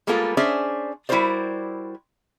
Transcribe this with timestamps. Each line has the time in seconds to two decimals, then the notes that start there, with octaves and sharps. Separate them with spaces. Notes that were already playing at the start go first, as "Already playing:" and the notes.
0.07 G3 G#3 A#3 B3 F4 A4
0.37 C#4 D4 G#4 C5 D5 E5
1.09 G3 E4 F#4 A#4 C5 D5